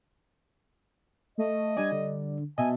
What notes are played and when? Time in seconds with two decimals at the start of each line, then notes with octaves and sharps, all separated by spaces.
1.38 A3 D#5
1.77 G3 D4 D5 G#5
1.92 D3
2.58 B2 D#5 E5 G#5 A5